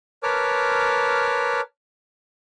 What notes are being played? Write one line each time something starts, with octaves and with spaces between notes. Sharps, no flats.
A#4 B4 C#5 A5 D6 F6